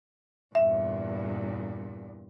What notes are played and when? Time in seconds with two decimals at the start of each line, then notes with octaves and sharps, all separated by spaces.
0.55 E2 G2 A#2 E5